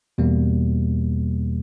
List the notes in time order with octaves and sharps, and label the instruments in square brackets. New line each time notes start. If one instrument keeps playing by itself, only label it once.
[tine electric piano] E2 B2 G3 A#3